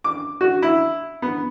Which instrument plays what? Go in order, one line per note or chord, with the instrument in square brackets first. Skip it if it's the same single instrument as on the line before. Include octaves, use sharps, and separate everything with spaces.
[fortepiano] D6
F#4
E4
B3